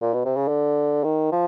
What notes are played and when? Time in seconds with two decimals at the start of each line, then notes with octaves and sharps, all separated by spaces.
0.02 A#2
0.14 B2
0.25 C3
0.36 C#3
0.48 D3
1.04 D#3
1.32 F3